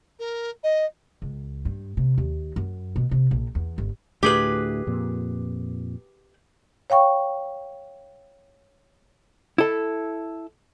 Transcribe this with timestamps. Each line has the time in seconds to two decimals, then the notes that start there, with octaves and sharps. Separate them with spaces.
0.20 A#4
0.64 D#5
1.22 C#2
1.65 G2
1.97 C3
2.18 D#2
2.56 F#2
2.96 B2
3.11 C3
3.31 A#1
3.55 E2
3.78 G1
4.23 D2 A2 A3 G4 G#4 B4
4.87 F2 A#2
6.90 C#5 F5 G5 C#6
9.58 E4 A4